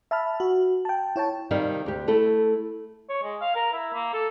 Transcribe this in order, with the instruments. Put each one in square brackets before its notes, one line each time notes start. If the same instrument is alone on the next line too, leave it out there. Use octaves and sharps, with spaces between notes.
[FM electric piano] E5 A5 B5 F6
F#4
G5 A5
E4 C#5 G5 A5
[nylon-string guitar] C3 D#3 G3 D#4 F5
D2 G4
A3 E4 A4
[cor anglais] C#5
G#3
F5
A#4
E4
A#3
A4